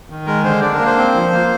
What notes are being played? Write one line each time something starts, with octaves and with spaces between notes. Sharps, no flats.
D#3
G#3 A#4
D3 C5
D4 D5
A#4
A#3
C5
C4
F3
A#3